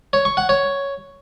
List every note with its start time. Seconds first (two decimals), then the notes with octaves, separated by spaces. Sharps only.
0.13 C#5
0.25 C#6
0.37 F#5
0.49 C#5